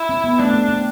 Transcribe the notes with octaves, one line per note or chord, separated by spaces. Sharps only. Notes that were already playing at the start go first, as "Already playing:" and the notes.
Already playing: E4
C4
B3
A3 D4
C4
C4